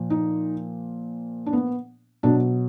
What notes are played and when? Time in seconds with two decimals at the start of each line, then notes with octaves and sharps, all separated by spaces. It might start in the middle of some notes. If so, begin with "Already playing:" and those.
Already playing: A#2 F3
0.10 D#4
1.46 D4
1.53 B3
2.23 B2 F#3 D4